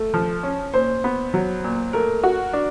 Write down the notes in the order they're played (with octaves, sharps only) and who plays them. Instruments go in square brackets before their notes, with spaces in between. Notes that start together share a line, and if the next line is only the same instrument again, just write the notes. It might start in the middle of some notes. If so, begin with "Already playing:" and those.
Already playing: [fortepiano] A3
F3
C#4
[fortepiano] A#2 [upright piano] C5
[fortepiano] B3
F#3
A#2
[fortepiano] A3 [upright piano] A#4
[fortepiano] F#4
D4